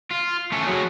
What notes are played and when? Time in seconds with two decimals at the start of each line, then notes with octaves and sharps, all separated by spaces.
0.11 F4
0.52 A3 C#4
0.67 F#3 G#4